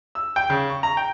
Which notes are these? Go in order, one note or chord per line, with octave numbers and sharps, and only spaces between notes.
E6
G5
C#3
C#6
A#5
G5